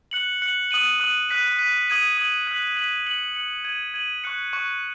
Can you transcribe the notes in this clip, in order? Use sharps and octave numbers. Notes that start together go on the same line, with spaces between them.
F#6 C#7 F#7
F#6 C#7 F#7
D#6 F#6 D#7 F#7
D#6 F#6 D#7 F#7
F#6 B6 D#7
F#6 B6 D#7
D#6 G#6 D#7 F#7
D#6 G#6 D#7 F#7
F#6 B6 F#7
F#6 B6 F#7
F#6 C#7 F#7
F#6 C#7 F#7
G#6 D#7 F#7
G#6 D#7 F#7
C#6 F#6 C#7
C#6 F#6 C#7